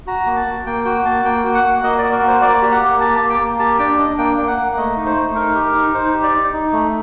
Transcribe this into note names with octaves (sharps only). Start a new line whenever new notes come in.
F#4 A#5
A#3
A5
A#3
A#3 G5
F#4 G5
A#3 A5
A#3 G5
F#4
F#5
A#3
A#3 D#5
F#4 D5
A#4
A#3
C5
A#3 D5
G4
F#5
A#3
G4 A5
A#3 A5
G5
A#3
G4 A5
D4 G5
D4 D#5
A#3 G5
A#3
F#5
A#3
A3 D#5
D#4
C5
A3
D#4 A#4
G4
A#4
D#4
D#4 C5
G4
D5
D#4
D#4
A3